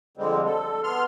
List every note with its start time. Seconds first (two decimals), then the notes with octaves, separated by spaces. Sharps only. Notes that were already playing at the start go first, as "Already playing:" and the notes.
0.17 F2 D3 G3 G#3 C4
0.46 A4
0.83 B3 C6 F6